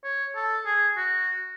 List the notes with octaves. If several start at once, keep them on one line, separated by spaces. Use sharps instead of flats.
C#5
A4
G#4
F#4